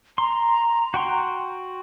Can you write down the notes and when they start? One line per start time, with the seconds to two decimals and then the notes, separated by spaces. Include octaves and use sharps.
0.18 A#5 C6
0.94 F#4 G5 C6